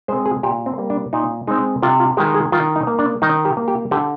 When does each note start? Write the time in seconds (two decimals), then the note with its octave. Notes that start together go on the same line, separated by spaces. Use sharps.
0.08 G#3 C5
0.13 C4
0.26 G#4
0.43 A#2 G4
0.66 C4
0.78 G3 A#3
0.90 D4
1.13 A#2 D#4
1.47 G#3 C4 D#4
1.82 C3 F4
2.00 F4
2.17 D#3 G#3 G4
2.35 G#4
2.52 D#3 F4
2.76 D#4
2.87 A#3
2.99 D4
3.22 D#3 D#4
3.45 G4
3.57 A#3
3.68 G4
3.91 D3 G4